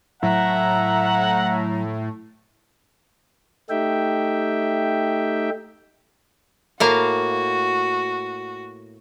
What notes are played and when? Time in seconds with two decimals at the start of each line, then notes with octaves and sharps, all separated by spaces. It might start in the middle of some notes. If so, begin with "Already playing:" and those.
0.23 A2 F#3 E5 F#5 A#5
3.70 A3 D#4 G4 E5 G5
6.80 A2 A#3 F#4 F5